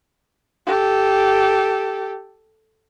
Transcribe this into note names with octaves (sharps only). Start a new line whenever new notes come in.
G4 A4